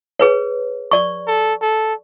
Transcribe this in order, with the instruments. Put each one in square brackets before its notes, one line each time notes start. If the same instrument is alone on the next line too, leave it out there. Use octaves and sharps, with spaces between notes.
[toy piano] G#4 B4 C#5
D5 C#6
[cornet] A4
A4